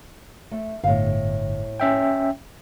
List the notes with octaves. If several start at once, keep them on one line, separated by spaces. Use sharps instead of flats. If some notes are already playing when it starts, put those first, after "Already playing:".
A3
G1 A2 F5
C#4 E5 G5